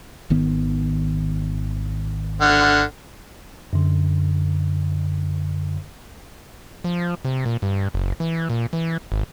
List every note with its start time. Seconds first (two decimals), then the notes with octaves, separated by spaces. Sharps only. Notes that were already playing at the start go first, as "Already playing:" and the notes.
0.30 G#1 D#3 B3
2.41 D3 F#5 F6
3.73 F#2 D3
6.84 F3
7.25 C3
7.46 A#2
7.62 G2
7.94 F#1
8.20 E3
8.50 A#2
8.73 E3
9.12 G#1